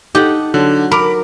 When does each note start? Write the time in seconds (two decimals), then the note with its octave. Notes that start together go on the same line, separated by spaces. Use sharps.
0.15 D#4 G4 A4 F#5
0.54 D3 F#3
0.91 A#4 B5 D6